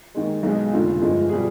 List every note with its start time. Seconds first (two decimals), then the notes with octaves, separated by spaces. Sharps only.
0.15 D#2 D#3 G#3
0.43 B1 B2 G#3
0.73 F1 D#2 D3 F4
1.01 G1 G2 F3 G#3
1.29 B2 G3 F4 G#4